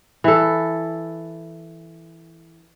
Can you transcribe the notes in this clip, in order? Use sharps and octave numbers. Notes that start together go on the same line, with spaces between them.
E3 A4